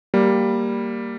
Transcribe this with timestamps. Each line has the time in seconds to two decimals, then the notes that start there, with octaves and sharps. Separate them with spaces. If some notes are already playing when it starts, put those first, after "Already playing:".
0.14 G3 A#3